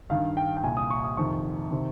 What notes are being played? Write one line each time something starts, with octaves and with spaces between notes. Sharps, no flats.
G2 D#3 F5
G5
G5
C2 A#2 G#5
D#6
C#6
D#6
F2 C3 D#3 C#6
C3 D#3